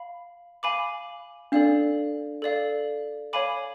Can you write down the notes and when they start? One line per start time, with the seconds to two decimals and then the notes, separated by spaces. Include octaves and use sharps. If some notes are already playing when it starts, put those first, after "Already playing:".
Already playing: F5 B5
0.63 F5 G#5 B5 D6
1.52 D4 A4 D5 F5
2.42 A4 D5 F5
3.33 C#5 F5 G#5 B5 D6